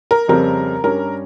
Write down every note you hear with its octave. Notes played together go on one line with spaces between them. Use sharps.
A#4
F2 C#3 G3 C4 A#4
G2 G3 C#4 A#4